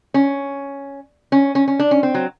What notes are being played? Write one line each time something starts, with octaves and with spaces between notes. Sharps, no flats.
C#4
C#4
C#4
C#4
D4
C#4
C4
F#3